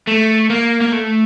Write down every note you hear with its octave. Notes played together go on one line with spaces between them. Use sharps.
A3
A#3
A#3
A3